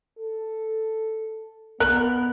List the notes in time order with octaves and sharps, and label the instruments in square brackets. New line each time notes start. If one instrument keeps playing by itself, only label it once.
[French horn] A4
[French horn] B3 [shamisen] A#4 [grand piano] F#6